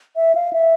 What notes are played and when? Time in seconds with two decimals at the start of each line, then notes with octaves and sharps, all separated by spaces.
0.16 E5
0.35 F5
0.53 E5